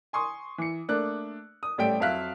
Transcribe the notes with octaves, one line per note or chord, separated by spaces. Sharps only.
G#5 C6 C#6 D#6
E3 C#7
A3 A#3 D4 F#6
D#6
A1 G3 A3 G5 D7
F2 F#3 E5 F5 F#6 B6